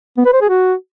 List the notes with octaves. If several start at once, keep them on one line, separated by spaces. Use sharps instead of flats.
B3
B4
C5
G#4
F#4